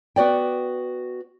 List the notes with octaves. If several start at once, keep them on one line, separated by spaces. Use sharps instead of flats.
B3 F#4 D5 G5